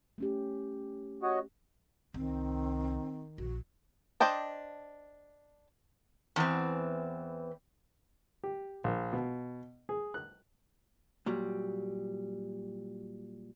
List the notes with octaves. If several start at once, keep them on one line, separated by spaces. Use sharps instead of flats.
A3 C#4 G4
F#4 C#5 D#5
C2 D#3 C4
A#1 F#4
D4 C5 D#5 G5 A5
E2 E3 B3 C4
G4
A#1
B2
G#4
F#6
A#2 F#3 G3